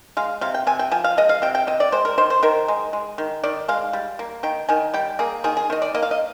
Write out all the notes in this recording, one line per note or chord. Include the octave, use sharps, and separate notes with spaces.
G#3 F5
C3 F5
G5
C3 G#5
G5
F3 G#5
F5
G#3 D#5
F5
C3 G5
G5
C3 D#5
D5
G#3 C5
A#4
D#3 C5
C5
D#3 A#4
G#3
G#3
D#3
D#3 D5
G#3 F5
G3
A#3
D#3 G5
D#3 G#5
G3 G5
A#3 G#4
D#3 G#4
G#4
D#3 D#5
D5
A#3 D#5
F5
D#5